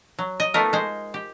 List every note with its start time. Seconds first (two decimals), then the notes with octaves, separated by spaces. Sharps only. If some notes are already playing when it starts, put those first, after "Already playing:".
0.19 F#3
0.40 D#5
0.54 A3 B3 D#4 F4 A#4
0.73 G#3 C5
1.14 G4